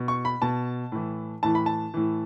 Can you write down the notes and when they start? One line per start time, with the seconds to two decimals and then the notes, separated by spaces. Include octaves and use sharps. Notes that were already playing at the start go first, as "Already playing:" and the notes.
Already playing: B2
0.08 C#6
0.25 B5
0.42 B2 A5
0.92 A2 E3
1.43 A2 E3 A5
1.55 B5
1.66 A5
1.94 A2 E3